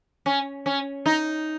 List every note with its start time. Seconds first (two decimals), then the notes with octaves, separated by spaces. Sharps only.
0.26 C#4
0.66 C#4
1.06 D#4